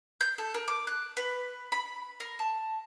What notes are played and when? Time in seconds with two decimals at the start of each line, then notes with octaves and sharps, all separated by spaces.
0.21 G6
0.38 A4
0.54 A#4
0.68 D6
0.87 F#6
1.17 B4
1.72 B5
2.20 A#4
2.39 A5